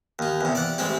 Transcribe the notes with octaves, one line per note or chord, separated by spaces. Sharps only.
D#2 D#4
E2 C3
D5 F#5
A1 G#3 C4 G4